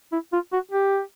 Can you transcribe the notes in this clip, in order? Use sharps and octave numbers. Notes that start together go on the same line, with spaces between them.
E4
F4
F#4
G4